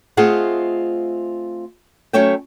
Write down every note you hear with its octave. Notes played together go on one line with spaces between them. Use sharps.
A3 C4 F4 G#4 D#5 F#5
F#3 A3 C#4 C#5 E5 G5